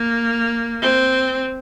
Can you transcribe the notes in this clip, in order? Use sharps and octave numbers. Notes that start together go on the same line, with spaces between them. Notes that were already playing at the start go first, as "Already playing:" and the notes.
Already playing: A#3
C4